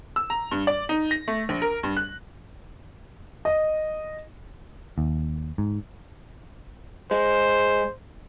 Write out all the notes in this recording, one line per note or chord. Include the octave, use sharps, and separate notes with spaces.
E6
A#5
G2
D5
D#4
A#6
A3
A#1
A#4
G2
F#6
D#5
D#2
G#2
G#3 C5